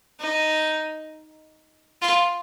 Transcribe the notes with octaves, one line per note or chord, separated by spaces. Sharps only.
D#4
F4